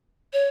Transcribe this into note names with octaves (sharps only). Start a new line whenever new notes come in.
C#5